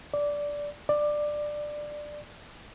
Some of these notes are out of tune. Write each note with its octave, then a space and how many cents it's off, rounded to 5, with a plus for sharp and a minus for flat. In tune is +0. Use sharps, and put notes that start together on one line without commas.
D5 -10
D5 +15